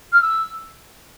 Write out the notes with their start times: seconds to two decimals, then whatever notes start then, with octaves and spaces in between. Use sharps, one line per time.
0.12 F6
0.22 E6